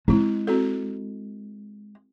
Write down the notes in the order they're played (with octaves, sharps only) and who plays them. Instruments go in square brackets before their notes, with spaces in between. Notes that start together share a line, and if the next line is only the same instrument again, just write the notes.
[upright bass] G#3 [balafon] C4 E4
[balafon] C4 F#4 A4